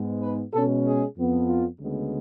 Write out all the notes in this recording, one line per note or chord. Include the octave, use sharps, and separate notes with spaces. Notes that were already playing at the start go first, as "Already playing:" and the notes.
Already playing: G#2 G#3 B3
B4
B2 G#3 C#4 A4
G#4
F2 F3 B3
F4
D2 C#3 G#3 B3